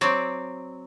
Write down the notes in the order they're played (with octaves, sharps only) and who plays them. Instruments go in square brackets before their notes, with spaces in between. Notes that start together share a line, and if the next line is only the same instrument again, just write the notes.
[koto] F#3 C4 D5